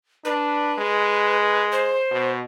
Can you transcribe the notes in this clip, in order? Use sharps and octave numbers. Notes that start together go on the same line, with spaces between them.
D4 B4
G#3
C5
B2